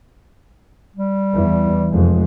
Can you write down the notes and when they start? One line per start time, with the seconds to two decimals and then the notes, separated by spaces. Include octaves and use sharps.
0.96 G3
1.34 E2 E3
1.90 F1 F2 G#3